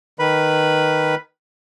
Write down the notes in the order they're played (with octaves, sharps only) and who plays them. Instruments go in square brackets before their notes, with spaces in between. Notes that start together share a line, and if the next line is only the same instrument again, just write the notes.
[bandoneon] D#3 B4 B5